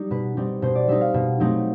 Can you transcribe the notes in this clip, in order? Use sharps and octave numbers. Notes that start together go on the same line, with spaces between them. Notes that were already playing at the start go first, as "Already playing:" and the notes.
Already playing: G3 D#4
B2 B4
G3 C4 D#4
B2 C5
D5
G3 C4 D#4 E5
F5
B2
F#3 A3 C4 D#4